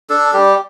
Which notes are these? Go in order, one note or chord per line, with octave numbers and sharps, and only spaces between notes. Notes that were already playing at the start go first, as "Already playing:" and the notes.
D4 A4
G3 G4